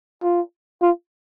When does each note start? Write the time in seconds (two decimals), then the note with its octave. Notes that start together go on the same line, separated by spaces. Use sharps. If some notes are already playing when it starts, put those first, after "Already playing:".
0.23 F4
0.82 F4